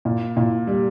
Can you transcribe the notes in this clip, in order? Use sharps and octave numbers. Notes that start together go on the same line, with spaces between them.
A#2
A#2
G3